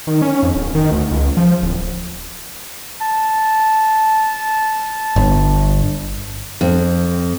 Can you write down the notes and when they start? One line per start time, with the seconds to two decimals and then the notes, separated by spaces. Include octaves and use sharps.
0.07 D#3
0.22 C#4
0.43 F2
0.55 D1
0.75 D#3
0.91 D2
1.11 C#2
1.37 F3
1.63 D1
3.01 A5
5.16 G1
6.61 F2